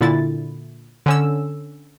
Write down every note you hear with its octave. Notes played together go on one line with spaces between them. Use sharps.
A#2 D3 E4 A6
D3 C#4 E6